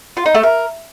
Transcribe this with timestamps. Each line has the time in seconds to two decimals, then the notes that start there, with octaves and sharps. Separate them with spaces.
0.17 F4
0.26 D#4
0.35 A3
0.43 A#4